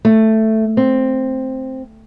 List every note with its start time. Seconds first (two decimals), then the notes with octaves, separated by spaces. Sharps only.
0.05 A3
0.77 C4